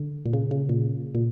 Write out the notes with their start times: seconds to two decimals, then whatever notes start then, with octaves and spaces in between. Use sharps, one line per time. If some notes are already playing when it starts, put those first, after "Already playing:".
Already playing: D3
0.26 A#2
0.33 C#3
0.51 C#3
0.69 A#2
1.15 A#2